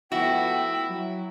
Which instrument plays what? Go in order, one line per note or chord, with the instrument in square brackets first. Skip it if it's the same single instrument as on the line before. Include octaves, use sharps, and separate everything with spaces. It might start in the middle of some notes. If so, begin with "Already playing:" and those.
[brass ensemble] F3 A3 B3 [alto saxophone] E4 [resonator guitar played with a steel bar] F#4 [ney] G5
[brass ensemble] F#3